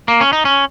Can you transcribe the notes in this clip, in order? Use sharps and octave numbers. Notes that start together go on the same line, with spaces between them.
A#3
C#4
D#4
C#4